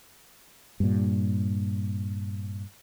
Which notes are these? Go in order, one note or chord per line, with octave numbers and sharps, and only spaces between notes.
G2 A#2